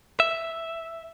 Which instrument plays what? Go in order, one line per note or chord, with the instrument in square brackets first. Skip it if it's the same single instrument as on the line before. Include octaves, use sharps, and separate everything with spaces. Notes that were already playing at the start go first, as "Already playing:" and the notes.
[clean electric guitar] E5